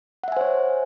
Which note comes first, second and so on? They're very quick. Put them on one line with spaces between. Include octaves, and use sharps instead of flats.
F#5 E5 G#5 C5 C#5